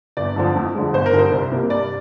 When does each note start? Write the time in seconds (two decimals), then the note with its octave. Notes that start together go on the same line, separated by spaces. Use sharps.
0.17 G1 D5
0.36 F2 D3 F3
0.56 F2
0.75 D3 F3 G#3
0.93 G1 C5
1.06 A#4
1.13 F2 D3 G3 C4
1.19 C5
1.32 C2
1.51 C3 G3 A#3
1.70 G2 D5